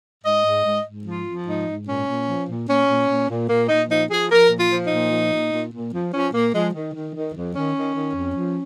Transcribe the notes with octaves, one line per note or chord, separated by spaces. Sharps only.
G#2 D#5
G#2
G#2
G#2
F3 F4
F3
G#2 D#4
G#2
A#2 C#4
A#2
F3
A#2
A#2 C#4
A#2
A#2
A#2
A#2 A#3
A#2 D#4
F3 D#4
F3 G#4
F3 A#4
A#2
F4
F3
D#4
A#2
F3
A#2
A#2
A#2
F3
F3 C#4
A#2 A#3
F3 G#3
D#3
D#3
D#3
F2
D#3 C#4
D#3
D#3
F2
F3